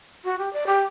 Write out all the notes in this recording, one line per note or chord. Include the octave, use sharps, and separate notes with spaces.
F#4
G4
D5
G4